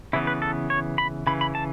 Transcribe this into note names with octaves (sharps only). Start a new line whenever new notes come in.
C#3 E3 B3 E4
B4
A4
C#5
B5
C#3 E3 B5
B5
A5